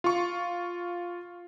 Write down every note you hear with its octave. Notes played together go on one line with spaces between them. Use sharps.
F4 C#6